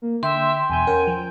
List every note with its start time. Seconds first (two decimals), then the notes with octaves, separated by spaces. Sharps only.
0.02 A#3
0.23 D3 E5 G5 C6
0.70 E2 B2 G#5 G6
0.87 C#4 A#4 F#5
1.07 F3